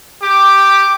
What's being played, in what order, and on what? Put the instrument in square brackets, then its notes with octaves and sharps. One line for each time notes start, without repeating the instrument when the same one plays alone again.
[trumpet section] G4 D6